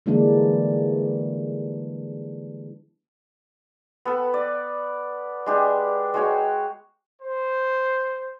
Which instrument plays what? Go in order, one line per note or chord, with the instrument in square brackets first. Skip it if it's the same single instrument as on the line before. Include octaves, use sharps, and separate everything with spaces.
[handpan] D3 E3 G3 G#3 A#3 D4
[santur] B3 A4 B4
D5
G#3 D4 G4
G#3 F#4 C#5 G5
[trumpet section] C5